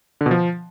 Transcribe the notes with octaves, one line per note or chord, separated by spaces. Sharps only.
D3
B2
F3